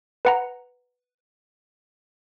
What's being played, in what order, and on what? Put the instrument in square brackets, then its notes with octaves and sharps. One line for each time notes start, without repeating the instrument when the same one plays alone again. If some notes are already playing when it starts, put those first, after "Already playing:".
[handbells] B4 F#5 A#5